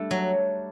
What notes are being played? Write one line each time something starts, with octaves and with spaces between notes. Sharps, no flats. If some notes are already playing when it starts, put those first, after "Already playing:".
Already playing: G3 A3 D4
F#3